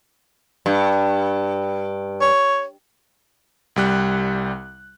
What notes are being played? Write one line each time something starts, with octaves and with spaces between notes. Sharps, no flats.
G2
C#5
C2 G3 F#6